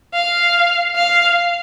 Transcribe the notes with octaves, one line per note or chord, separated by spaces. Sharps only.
F5
F5